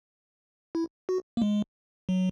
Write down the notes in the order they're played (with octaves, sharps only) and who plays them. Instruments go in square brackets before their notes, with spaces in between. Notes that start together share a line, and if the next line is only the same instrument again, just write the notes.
[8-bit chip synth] E4
F#4
A#3
G#3
F#3